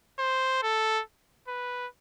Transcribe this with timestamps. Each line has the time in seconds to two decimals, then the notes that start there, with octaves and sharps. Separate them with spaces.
0.19 C5
0.62 A4
1.48 B4